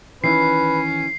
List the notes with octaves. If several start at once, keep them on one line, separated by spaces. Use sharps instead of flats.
D#3 E3 C#4 B4 C7